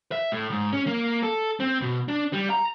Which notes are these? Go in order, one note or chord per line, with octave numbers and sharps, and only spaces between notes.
E5
A2
G#2
C#4
A#3
A4
C4
B2
D4
G3
A#5